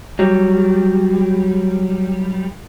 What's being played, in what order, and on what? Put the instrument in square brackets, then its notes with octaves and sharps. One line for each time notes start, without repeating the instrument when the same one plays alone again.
[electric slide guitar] F#3 G3